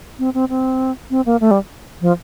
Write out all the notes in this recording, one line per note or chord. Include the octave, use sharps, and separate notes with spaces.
C4
C4
C4
C4
A#3
A3
G3
F3